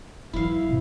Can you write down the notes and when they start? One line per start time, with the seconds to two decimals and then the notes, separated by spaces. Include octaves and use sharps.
0.33 E3 F#3 E4 F5
0.66 E2 C3